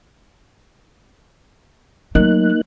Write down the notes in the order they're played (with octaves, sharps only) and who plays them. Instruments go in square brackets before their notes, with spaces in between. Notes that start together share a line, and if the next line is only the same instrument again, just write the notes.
[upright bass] F#3 A3 [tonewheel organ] A#3 D#4 F#6